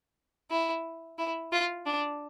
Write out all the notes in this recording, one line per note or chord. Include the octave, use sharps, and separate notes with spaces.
E4
E4
F4
D4